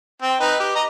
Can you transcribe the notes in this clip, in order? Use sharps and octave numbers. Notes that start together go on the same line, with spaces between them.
C4 G5
D#4 B4
G4
D#5 A#5